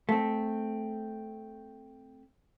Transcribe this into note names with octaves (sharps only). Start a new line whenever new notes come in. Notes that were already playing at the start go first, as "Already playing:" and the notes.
A3 C4